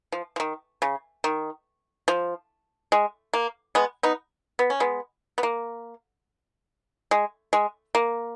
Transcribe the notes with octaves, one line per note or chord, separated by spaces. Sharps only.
F3
F3
D#3
C#3
D#3
F3
G#3
A#3
G#3 B3
B3 D#4
B3
C#4
G#3 B3
B3
A#3
G#3
G#3
A#3